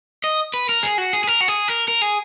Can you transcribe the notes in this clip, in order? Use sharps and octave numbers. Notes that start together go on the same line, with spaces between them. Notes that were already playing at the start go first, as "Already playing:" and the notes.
D#5
B4
A#4
G#4
F#4
G#4
G#4
A#4
F#4
G#4
A#4
A#4
G#4